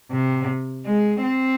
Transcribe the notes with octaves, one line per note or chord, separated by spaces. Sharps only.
C3
G#3
C4